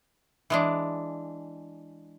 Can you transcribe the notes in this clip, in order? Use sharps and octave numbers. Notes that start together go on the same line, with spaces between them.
E3 G#3 D4